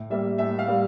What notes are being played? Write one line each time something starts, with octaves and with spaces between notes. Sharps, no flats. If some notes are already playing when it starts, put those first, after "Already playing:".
Already playing: A2
G3 A#3 E5
A2 E5
F5
G3 A#3